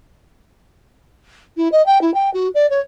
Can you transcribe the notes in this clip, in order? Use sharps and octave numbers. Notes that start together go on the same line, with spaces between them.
E4
D#5
G5
E4
G5
F#4
D5
C#5